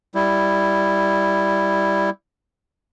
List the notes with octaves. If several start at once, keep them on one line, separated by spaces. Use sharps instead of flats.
G3 E4